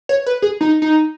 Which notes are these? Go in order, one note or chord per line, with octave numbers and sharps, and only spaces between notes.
C#5
B4
G#4
D#4
D#4